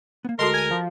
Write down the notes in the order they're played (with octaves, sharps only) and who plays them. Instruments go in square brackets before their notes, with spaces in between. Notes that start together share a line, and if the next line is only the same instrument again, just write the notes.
[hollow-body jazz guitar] A#3 B3
[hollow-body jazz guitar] D2 G#3 A5 [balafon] F#4 A4 D#5 [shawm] A#4 [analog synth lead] C6
[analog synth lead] G#5
F3